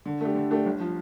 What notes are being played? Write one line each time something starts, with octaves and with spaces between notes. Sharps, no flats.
D3
A3 D4 G4
D3
A3 D4 G4
G1
F3